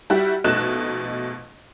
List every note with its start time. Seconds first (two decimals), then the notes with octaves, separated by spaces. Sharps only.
0.10 G3 E4 F#4 G4
0.44 A#1 B2 A3 D#4 F#6 E7